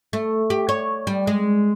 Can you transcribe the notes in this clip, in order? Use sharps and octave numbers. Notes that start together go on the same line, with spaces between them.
A3
G4
C#5
G3
G#3